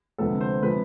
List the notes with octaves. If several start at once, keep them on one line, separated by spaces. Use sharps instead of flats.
D2 C3 F3 G#3 B3 A4
C5
C3 F3 G#3 B4